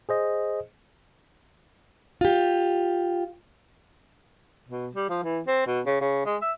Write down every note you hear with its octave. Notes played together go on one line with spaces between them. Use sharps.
G#4 C5 D#5
F4 G4
B2
G3
F3
E3
C4
B2
C#3
C#3
G#3
E5